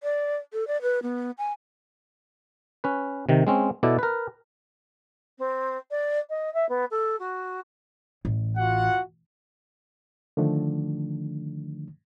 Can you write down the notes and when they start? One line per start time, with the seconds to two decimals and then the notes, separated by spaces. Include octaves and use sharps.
0.03 D5
0.53 A4
0.68 D5
0.82 B4
1.03 B3
1.38 G#5
2.84 C#4 B4
3.29 C3 D#3
3.47 G#3 C4 C#4
3.83 B2 E4 A4 D5
3.99 A#4 B4
5.38 C4
5.90 D5
6.29 D#5
6.53 E5
6.69 B3
6.90 A4
7.19 F#4
8.25 A1
8.58 F4 F#4 F#5
10.37 D3 D#3 F3 A3 D4